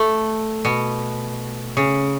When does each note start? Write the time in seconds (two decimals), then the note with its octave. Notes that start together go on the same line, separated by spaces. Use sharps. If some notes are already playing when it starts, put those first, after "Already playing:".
Already playing: A3
0.65 B2
1.77 C#3